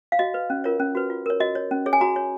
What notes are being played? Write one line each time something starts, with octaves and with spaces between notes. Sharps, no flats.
F5
F#4 D#5
B4
C#4
F4 A#4 C#5
C#4
F#4 B4
F4
A#4 C#5
F#4 D#5
C#5
C#4
G#4 C#5
G#5
F#4 A#5
C#5